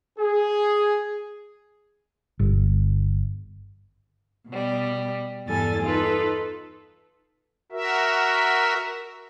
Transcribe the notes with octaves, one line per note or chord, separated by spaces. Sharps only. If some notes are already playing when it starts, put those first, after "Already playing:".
G#4
G1
B2 G3
E2 G2 G3 A4 G#5 A6
D#4 F4 A4 B4
F#4 A#4 E5